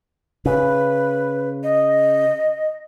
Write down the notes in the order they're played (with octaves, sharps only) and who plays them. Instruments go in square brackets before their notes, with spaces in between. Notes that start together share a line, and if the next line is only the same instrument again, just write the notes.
[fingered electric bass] C#3 [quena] B4
[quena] D#5